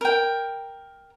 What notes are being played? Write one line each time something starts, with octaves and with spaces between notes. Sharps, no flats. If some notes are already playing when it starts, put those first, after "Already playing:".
A#4 G5